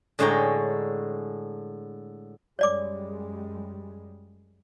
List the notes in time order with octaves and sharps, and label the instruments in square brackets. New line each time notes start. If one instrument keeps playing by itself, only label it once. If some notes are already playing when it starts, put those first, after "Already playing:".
[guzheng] A2 D3 G#3 C#5 G5 A#5
[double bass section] F#2 G3 G#3 [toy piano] C#5 D5 D6